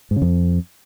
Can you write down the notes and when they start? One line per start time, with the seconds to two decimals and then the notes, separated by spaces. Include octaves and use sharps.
0.11 G#2
0.16 C#3
0.22 F2